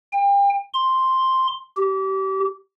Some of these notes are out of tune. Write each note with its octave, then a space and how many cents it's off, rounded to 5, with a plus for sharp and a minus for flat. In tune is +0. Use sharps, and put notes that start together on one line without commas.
G5 +35
C6 +5
G4 -30